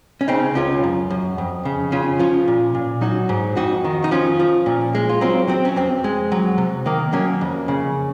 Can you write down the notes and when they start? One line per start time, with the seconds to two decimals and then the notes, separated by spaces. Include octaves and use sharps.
0.21 C#4
0.28 C#3 C4 D#4
0.55 C#2 C#4 F4
0.83 F#2
1.10 F#2
1.38 F2
1.65 C#3
1.92 C#3 C#4 F4
2.19 F3 C#4 F4
2.48 A#2
2.75 A#2
3.01 F#3 D#4 F#4
3.29 G#2
3.57 F2 D#4 F#4
3.84 D#3
4.04 D#4
4.11 F3 C#4 F4
4.40 F3
4.66 A#2
4.95 G#3
5.09 F4
5.21 F#3 C4 D#4
5.48 F#3 C4
5.65 C#4
5.76 F2 C4
6.04 G#3
6.32 F#3
6.58 C3
6.86 D#3 A#3
7.13 F#3 A#3 C#4
7.41 F2
7.68 C#3